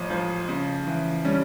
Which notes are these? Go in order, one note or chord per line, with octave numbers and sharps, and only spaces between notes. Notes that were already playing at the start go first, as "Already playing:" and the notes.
Already playing: A1 F3
F3
C#3
E3
G3 C#4